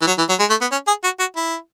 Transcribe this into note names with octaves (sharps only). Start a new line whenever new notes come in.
E3
F#3
E3
F#3
G#3
A3
B3
C#4
G#4
F#4
F#4
E4